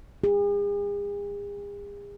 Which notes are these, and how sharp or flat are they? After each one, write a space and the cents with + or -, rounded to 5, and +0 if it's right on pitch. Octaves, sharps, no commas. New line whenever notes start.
G#4 -40